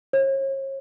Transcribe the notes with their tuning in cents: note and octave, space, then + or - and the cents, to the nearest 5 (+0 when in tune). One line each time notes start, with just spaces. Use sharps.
C#5 -40